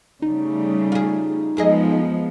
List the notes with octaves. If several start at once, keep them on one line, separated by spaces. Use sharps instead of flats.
C#3 G3 A3 D#4
F4 G#4
F#2 F3 G#3 B3 G#4 D#5